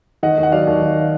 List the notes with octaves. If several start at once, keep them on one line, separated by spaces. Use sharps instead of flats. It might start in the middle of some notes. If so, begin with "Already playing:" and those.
D#3 D#5 F#5
D#2
F#5
F#3 D5 F5
D#2
D#3